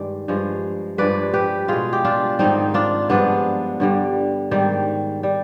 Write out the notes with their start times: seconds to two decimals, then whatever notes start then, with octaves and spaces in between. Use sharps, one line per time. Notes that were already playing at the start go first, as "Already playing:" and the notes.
Already playing: G2 D#3 G#3 D5
0.28 G2 F3 G#3
0.98 G2 F3 G#3 B4 D5
1.33 G4 B4
1.68 B2 G#3 F4 G#4
1.93 G4
2.04 D4 F4
2.39 G#2 D#3 G3 C4 D#4
2.74 D4 F4
3.09 G2 F3 G#3 B3 D4
3.80 G2 D3 G3
4.51 G#2 D#3 G3
5.23 G3